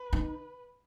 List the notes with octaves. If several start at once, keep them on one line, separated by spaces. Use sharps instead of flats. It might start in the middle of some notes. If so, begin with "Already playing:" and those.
Already playing: B4
D#4